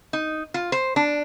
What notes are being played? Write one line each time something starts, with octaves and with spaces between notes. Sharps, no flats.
D#4
F4
C5
D4